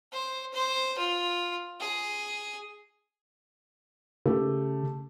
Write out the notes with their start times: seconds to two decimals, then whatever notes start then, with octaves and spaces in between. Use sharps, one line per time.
0.12 C5
0.54 C5
0.98 F4
1.80 G#4
4.26 C#3 A3 G4